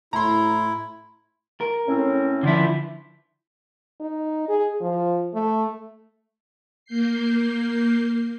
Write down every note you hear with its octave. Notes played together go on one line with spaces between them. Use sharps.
A2 E4 A#5 C6
A#4
A2 C4 C#4
D3 F3 E4
D#4
G#4
F3
A3
A#3 G6 C7